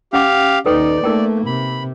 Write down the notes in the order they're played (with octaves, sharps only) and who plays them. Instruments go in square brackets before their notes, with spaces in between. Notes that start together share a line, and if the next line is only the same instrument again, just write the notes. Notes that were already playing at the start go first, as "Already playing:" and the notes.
[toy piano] C#4 F#5 D6 [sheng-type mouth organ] G4 F5
[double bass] D#2 D#4 [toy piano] A4 B4 G5 [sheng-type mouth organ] D5
[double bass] A3 A#3 [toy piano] D#4 A#4 G5
[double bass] C3 [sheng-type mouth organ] B5